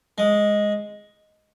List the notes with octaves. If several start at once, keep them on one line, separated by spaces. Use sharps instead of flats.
G#3